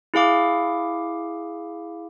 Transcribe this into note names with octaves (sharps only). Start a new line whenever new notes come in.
E4 G#4 F5 D6